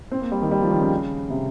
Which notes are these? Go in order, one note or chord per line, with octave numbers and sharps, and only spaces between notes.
C4
A#3
G3
D#3
G3
F3
D#3
C#3
C3